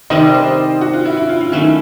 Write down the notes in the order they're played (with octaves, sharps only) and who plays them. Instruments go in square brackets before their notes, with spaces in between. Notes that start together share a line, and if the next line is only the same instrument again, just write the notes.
[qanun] C3 D#3 G3 C4 [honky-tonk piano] D#5
[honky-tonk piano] D5
C5
G4
F#4
F4
E4
E4
F4
F4
[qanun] D#3 F#3 A3 C#4 [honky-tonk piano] E4